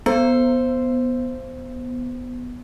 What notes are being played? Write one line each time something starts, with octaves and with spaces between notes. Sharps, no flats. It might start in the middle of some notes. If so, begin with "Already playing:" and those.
B3 C5